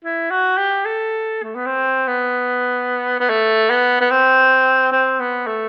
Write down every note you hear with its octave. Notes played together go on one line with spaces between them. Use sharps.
E4
F#4
G4
A4
A3
B3
C4
B3
B3
A3
B3
B3
C4
C4
B3
A3